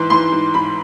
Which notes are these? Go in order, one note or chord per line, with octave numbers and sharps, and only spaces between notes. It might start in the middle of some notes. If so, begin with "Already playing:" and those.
Already playing: G#2 E3 C6
E3 C6
G#2
G#2 B5